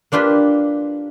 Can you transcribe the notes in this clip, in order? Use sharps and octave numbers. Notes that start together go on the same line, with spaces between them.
A#3 D4 F4 G4 B4